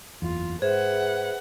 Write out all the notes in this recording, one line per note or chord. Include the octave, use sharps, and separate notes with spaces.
F#1 E2 F4
G#2 G#4 B4 C5 E5 F#5